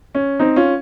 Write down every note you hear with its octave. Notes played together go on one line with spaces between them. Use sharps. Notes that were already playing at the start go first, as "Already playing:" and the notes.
C#4
C4 D#4
C#4 F4